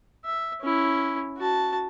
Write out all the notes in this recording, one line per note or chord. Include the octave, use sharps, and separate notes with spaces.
E5
C#4 E4
F#4 A5